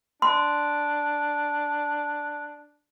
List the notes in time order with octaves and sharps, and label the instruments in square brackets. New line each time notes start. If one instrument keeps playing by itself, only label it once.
[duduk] D4 [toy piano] C6